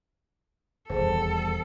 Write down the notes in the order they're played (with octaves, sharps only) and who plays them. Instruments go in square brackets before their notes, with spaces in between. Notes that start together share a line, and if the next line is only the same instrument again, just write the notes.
[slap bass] D#1 E2 G3 [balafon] G#4 C5 [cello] A4